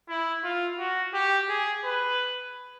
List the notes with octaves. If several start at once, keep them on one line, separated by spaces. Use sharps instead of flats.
E4
F4
F#4
G4
G#4
B4